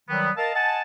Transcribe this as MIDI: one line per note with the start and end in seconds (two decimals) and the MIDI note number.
0.10 0.30 51
0.10 0.30 54
0.10 0.30 55
0.10 0.30 59
0.38 0.53 70
0.38 0.53 75
0.38 0.53 77
0.38 0.53 81
0.55 0.82 75
0.55 0.82 78
0.55 0.82 80
0.55 0.82 81